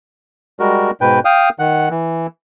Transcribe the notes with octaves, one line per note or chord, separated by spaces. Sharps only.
G3 G#3 F#4 A#4
G#2 B2 B4 G5
F5 G5 D#6
D#3 F#5
E3